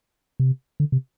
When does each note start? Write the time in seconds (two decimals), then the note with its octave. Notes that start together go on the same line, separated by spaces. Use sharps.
0.40 C3
0.80 D3
0.92 C3